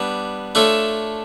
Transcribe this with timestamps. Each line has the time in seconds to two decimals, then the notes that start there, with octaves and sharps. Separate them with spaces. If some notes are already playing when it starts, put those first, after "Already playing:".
Already playing: G3 B3 D4
0.55 A3 D4 F4 A4 C#5